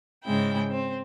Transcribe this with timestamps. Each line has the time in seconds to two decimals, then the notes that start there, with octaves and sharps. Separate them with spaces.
0.24 G#2 C#3 G#3 E4 G5
0.71 C4